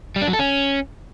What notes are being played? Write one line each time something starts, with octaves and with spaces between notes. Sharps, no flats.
G3
D4
F#3
A4
C#4